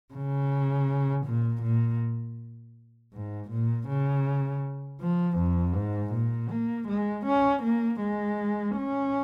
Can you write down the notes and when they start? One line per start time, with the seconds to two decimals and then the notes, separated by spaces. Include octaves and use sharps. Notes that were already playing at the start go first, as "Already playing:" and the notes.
0.13 C#3
1.26 A#2
1.62 A#2
3.13 G#2
3.50 A#2
3.89 C#3
5.01 F3
5.38 F2
5.75 G#2
6.14 A#2
6.50 A#3
6.88 G#3
7.26 C#4
7.63 A#3
8.00 G#3
8.76 C#4